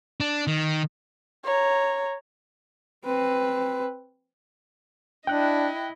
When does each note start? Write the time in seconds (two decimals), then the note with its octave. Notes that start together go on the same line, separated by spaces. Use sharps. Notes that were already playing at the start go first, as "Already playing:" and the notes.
0.20 D4
0.47 D#3
1.45 C#5 A#5
3.05 C4 B4
5.27 D4 E4 D#5 G5 F#6